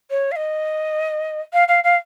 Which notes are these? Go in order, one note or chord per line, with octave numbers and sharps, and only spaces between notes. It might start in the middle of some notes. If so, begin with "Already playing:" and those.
C#5
F5
D#5
F5
F5
F5